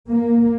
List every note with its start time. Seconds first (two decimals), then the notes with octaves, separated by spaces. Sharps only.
0.08 A#3